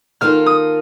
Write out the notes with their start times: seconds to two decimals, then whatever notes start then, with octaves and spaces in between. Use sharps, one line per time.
0.21 D#3 A#3 F4 A4 F6
0.46 D#6